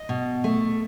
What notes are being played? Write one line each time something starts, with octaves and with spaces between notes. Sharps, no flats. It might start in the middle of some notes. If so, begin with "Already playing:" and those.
Already playing: D#5
B2
A3